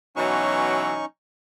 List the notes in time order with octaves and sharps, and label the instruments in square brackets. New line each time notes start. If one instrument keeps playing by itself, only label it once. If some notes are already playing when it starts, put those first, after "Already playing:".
[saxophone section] B2 E3 F#3 [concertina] C#4 D#4 C#6